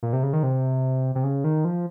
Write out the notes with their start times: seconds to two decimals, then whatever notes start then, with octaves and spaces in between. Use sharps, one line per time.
0.03 A#2
0.13 C3
0.23 C#3
0.33 D#3
0.43 C3
1.15 C3
1.24 C#3
1.44 D#3
1.65 F3